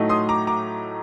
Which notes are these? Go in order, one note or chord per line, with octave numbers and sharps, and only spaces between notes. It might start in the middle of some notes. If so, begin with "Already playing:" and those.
Already playing: A2 F#3 A3 D#4
C6 D#6
A#5 D6
A#5 D6